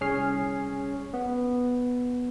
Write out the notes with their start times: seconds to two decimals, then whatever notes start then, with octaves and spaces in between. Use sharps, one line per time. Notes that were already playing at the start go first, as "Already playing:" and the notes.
0.01 C2 C#4 G#4 C#5 F6 C7
1.14 B3